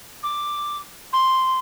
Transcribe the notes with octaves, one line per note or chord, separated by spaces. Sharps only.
D6
C6